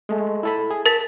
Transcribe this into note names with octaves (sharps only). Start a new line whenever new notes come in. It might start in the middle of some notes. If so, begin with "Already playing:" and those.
G#3 A3
E4 A4 B5
G#4
A#4 A5 A6 B6